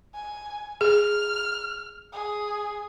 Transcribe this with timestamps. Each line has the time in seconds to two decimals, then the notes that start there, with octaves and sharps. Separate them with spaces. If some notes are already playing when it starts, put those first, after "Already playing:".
0.15 G#5
0.81 G#4 F6
2.13 G#4